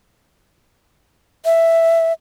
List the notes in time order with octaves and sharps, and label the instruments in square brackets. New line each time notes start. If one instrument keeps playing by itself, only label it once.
[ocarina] E5